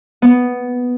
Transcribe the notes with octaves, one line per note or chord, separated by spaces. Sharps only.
B3